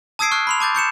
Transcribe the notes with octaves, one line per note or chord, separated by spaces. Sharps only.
A5 D#6 E6 G#6 C7 D7
C#6 F6 F#6 C7
B5 C6 F7
A5 D6 G6 A6
C#6 G6 C#7 E7